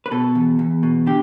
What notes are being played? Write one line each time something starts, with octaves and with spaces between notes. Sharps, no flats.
B4
B2 A4
E2
E2
B2
D3 G4